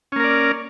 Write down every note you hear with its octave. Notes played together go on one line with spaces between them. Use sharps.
A#3 C#4 A#4 D5